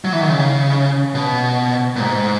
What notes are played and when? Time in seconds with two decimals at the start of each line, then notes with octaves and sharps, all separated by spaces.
0.05 F#3
0.13 E3
0.21 D#3
0.29 C#3
1.15 B2
1.96 A#2
2.00 G#2